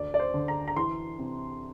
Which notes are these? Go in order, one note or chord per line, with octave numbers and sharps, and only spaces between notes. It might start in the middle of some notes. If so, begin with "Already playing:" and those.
Already playing: D2 D5
D5
C5
D3
A#5
A#5
E3 C6
C3